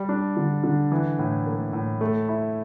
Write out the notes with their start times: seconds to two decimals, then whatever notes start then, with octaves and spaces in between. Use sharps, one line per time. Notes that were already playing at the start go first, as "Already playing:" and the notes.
Already playing: G3
0.09 D4
0.37 D3
0.64 D3
0.92 E3
1.19 A2
1.46 A#3
1.73 A2
2.01 A3
2.29 E4